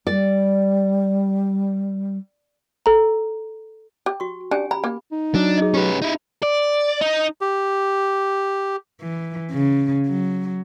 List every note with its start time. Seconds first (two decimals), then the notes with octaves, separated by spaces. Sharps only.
0.07 G3 D5
2.86 A4 A#5
4.06 G4
4.20 F#4 C#6
4.51 C#4 D4 G4 G#5
4.71 A#5 B5
4.84 A#3
5.12 D#4
5.34 F#3 D4
5.58 G#4 D#5
5.74 C#4 G4 B4
6.02 D#4 E4
6.43 D5
7.01 D#4
7.41 G4
9.02 E3
9.52 C#3
10.08 F#3